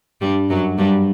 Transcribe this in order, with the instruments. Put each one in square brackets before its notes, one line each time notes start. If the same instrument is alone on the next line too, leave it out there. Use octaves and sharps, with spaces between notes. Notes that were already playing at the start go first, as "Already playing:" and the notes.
[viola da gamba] G2 G3
F#2 F#3
G2 G3